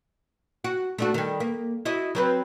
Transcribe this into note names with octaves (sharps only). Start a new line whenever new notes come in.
F#4
A3 D4 F#4
D#3 G3
A#3
E4 F#4 D#5
F#3 C4 B4